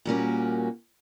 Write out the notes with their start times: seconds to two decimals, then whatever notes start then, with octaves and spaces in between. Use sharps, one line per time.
0.05 A#2 G3 A#3 C#4 F#4